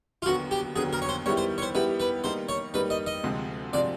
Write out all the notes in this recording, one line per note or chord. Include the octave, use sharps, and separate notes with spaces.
F4
D#2 D3 F#3 B3 F#4
G4
D#2 D3 F#3 B3 G#4
A#4
C#5
C5
D#3 G3 B3 E4 G4 C#5
C5
C#5
C5
D#3 G3 B3 E4 G4 B4
B4
D#3 G3 A#3 D#4 C5
C#5
D#3 G3 A#3 D#4 B4
D#5
D#5
D2 C3 F3 G#3 C4
C3 F3 G#3 C4 D5